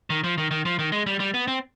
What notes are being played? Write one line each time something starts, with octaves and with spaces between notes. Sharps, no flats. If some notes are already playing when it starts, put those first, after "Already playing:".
D#3
F3
D#3
D#3
F3
D#3
G#3
G3
G3
B3
C4